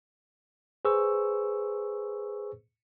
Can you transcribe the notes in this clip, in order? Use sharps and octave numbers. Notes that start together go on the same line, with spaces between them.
G#4 B4 C5 C#6 E6